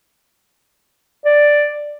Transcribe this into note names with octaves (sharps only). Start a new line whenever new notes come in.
D5